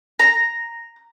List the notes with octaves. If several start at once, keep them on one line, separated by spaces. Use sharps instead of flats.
A#5